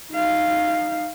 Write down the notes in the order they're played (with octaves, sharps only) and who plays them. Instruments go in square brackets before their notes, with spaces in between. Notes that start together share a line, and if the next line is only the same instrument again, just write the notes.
[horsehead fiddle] D#4 F5